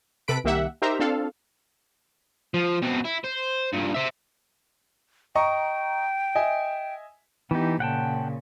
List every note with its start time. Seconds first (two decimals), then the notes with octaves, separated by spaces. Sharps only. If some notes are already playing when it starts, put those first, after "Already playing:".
0.28 C3 A4 B4 B5 B6 D7
0.44 C2 D#3 A#3 G4 E5 F#5
0.82 D#4 G4 A#4 C5 E5 A#5
0.99 C4 D4 F4 A4 F5
2.54 F3
2.82 B2 C4
3.04 E4
3.24 C5
3.73 G2 A#2
3.94 C5 E5
5.35 D#5 G5 A#5 C#6
6.35 D#5 E5 G#5
7.51 E3 B3 D#4 G4
7.80 A#2 C#3 F#5 G5 A5